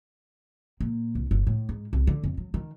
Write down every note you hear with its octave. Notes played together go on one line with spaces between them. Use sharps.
A#2
C2
G1
A2
G#2
C2
D3
F2
F#3
D#3